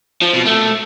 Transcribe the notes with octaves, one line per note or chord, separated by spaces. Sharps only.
F3
B2
A3